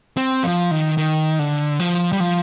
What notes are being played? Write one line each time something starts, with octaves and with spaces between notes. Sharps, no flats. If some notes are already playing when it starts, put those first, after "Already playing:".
C4
F3
D#3
D#3
D3
F3
G3
F3